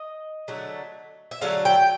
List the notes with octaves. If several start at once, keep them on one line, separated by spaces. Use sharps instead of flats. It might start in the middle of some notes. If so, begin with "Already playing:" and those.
Already playing: D#5
D3 F#3 A3
E5
D3 F#3 A3 F5
G5